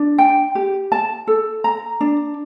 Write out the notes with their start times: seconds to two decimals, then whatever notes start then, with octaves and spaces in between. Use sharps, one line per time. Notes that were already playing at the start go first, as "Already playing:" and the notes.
Already playing: D4
0.18 G5
0.55 G4
0.92 A5
1.27 A4
1.64 A#5
2.01 D4